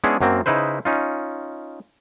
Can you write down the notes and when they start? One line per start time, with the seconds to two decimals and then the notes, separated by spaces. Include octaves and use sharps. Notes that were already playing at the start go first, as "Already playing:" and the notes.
0.04 G#3 B3 C#4 D4 E4 G#4
0.21 F#2 F#3 A#3 C4
0.46 C#3 D#4 E4 B4 C5
0.85 C#4 D#4 F4